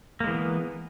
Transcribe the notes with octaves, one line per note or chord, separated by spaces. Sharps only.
E3 G#3 A#3 B3